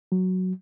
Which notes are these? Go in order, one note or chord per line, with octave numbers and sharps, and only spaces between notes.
F#3